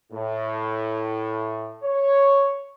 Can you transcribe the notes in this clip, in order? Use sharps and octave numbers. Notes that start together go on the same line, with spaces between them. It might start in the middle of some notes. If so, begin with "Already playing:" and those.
A2
C#5